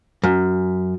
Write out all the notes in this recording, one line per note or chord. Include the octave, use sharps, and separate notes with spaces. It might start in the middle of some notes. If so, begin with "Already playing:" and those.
F#2